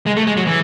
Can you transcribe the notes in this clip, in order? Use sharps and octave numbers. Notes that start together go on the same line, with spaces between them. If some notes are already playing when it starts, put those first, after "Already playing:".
G#3
A3
G#3
F#3
E3